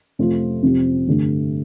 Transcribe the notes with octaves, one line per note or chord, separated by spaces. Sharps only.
F2 C3 A3 F4
F2 C3 G3 C4
G2 D3 A3